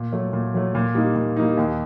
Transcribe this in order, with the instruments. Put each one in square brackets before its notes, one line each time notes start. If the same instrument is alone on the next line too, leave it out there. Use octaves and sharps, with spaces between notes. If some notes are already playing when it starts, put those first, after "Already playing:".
Already playing: [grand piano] A#2
F#3 A3
A#2
F#3 A3
A#2
G3 A#3 D#4
A#2
G3 A#3 D#4
D#2